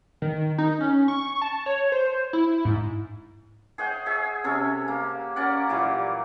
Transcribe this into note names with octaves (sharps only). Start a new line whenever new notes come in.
D#3
D#4
C#4
C#6
A5
C#5
C5
E4
G#2
G#4 C#5 F#5 G5
G#4 C#5 E5
C3 C#4 A4 C#5
A#3
C#4 A#4 D5 F#5
A#2 E3 F#3 G3